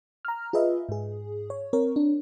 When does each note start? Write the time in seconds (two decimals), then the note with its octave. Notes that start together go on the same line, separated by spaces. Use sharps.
0.25 A#5 F6
0.53 F4 G#4 B4 D#5 E5
0.89 G#2 G#4
1.50 C#5
1.73 C4 A#4 C#5
1.96 D4